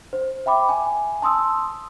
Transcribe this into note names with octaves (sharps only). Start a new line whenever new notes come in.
C5
E5 G5 B5 D6
G#5
A5 C6 D#6 E6